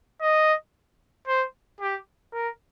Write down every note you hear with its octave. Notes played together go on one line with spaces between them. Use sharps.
D#5
C5
G4
A#4